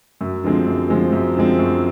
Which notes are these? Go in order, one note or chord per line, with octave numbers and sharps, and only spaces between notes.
F#2
D3 F3 G#3 C4
F#2
D3 F3 G#3 C4
F#2
D3 F3 G#3 C4
F#2